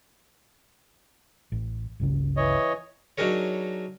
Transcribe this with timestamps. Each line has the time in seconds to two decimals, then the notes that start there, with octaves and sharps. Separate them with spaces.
1.52 A1
2.00 G1 C#2 C#3
2.37 E3 C#5 D#5
3.18 F#3 D4 D#4 G#4 A#4 C#5